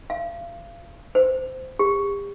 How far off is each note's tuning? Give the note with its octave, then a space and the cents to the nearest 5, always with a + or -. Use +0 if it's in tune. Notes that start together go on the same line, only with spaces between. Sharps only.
F5 -35
C5 -15
G4 +40